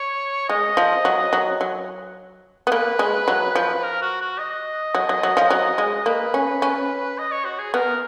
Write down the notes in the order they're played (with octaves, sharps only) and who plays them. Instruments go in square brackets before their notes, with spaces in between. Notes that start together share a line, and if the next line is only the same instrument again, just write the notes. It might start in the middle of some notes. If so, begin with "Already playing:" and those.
Already playing: [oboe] C#5
[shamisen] G#3 [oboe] D#5
[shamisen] F3
F#3
F#3
F#3
B3
[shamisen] A#3 [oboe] B4
[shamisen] G#3
F#3
F3
[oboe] A#4
F#4
F#4
D#5
[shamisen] F#3
F#3
F#3
F3
F#3
G#3
[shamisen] A#3 [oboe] B4
[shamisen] C#4
C#4
[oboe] D#5
C#5
F#4
G#4
[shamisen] B3 [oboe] A#4